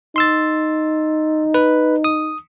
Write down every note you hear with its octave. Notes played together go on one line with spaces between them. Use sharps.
D#4 C6 E6 A6
B4
D#6